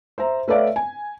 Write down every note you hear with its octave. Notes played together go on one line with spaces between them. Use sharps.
C5 E5 A#5
A3 B4 C#5 D5 E5 F5
G#5